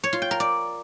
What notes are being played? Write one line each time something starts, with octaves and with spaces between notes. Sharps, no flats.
C#5
F4
G5
A#4
D5